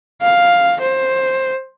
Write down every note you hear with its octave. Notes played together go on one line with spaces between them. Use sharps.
F5
C5